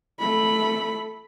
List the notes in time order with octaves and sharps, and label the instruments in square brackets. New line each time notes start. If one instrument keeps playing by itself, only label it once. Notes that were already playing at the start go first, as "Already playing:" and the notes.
[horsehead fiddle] A3 B5